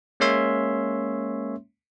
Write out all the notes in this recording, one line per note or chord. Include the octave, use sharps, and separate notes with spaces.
G#3 A#3 C#4 C#5 E5 C6